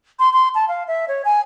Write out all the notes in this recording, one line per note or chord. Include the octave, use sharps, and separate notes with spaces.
C6
C6
A5
F5
E5
C#5
G#5